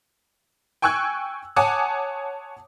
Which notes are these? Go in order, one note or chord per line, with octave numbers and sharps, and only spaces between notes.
G5 G#5 C#6 E6 F#6 G#6
C#5 F#5 G#5 A5 D6 D#6